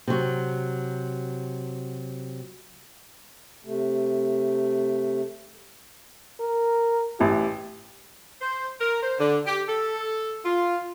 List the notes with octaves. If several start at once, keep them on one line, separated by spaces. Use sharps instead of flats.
C3 F#3
C3 A3
A#4
A1 E4 G4
C5
A#4
C5
D3
G4
A4
F4